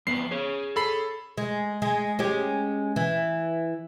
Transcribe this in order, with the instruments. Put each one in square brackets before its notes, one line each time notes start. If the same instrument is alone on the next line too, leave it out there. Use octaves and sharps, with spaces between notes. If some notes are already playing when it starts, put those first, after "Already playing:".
[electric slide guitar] F2 B3 B4 [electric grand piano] C7
[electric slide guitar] G#4 C#5
[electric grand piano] A4 B5 C7
[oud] G#3
G#3
G#3 C#4 G4
E3